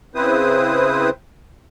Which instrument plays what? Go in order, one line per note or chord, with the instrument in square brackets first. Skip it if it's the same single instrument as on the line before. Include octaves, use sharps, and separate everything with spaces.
[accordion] C#3 C4 E4 B4 C5 D#6